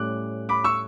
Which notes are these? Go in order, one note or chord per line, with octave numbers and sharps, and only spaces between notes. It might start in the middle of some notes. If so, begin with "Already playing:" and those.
Already playing: A2 G3 C#4 D6 F#6
B5 D6
C#6 E6